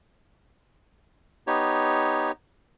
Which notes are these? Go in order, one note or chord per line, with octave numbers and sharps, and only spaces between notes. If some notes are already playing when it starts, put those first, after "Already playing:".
B3 D#4 G4 C#5